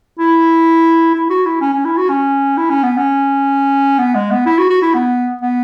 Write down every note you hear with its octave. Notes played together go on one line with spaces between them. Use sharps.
E4
E4
F#4
E4
C#4
C#4
E4
F#4
C#4
E4
C#4
B3
C#4
B3
G#3
B3
E4
F#4
F#4
E4
B3
B3